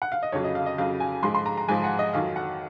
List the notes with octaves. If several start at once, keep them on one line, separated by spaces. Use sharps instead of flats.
F#5
F5
D#5
F2 C#3 F#3 C#5
D#5
F5
D#5
F2 C#3 F#3 F5
G#5
G#2 F3 G#3 C6
C6
A#5
A#5
G#2 F3 G#3 G#5
F#5
D#5
F2 D#3 F#3 F5
F#5